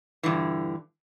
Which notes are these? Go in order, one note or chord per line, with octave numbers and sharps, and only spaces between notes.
G2 A#2 D3 E3